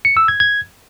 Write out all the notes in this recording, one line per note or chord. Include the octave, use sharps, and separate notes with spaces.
C#7
E6
G#6
G#6